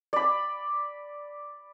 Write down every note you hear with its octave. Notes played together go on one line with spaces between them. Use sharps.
D5 B5